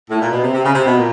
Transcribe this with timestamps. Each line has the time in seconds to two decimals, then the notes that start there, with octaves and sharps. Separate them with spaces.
0.09 A2
0.20 A#2
0.31 B2
0.42 C3
0.53 C3
0.64 C#3
0.74 C3
0.85 B2
0.96 A#2